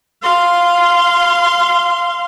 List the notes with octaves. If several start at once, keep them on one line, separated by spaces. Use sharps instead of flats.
F5 C6